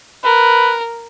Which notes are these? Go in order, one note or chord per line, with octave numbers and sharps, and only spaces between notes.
A#4 B4